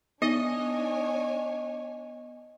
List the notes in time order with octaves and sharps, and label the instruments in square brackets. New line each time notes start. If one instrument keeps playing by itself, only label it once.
[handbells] B3 [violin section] D4 C#5 G#5 [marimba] D#4 [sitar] D#5